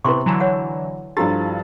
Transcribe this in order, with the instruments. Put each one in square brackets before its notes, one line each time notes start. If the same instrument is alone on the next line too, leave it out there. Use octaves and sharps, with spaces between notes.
[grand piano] C3 B3 [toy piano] E4 C6 C#6
[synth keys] D3 E3 F#3 [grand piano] A#5 E7
[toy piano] C#5 F#5
[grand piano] G2 F3 A4 [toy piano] E4 F#4 G4 [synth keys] A6